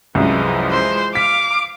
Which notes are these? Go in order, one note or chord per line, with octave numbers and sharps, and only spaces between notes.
C2 F#2 E3 F3 G#3
C5
F5 D6 B6